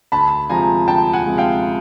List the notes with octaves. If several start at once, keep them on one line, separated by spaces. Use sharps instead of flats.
D2 A5 B5
C3 F3 G#3 G#5 A#5
D2 G5 A5
F#5 G#5
C3 F3 G#3
F5 G5